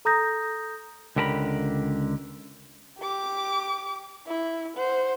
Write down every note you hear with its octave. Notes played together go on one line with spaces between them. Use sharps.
A4 A#5 D#6 G6 A#6
C#2 D3 G4 A#4 A5 B5
G4 D6
E4
C5 F#5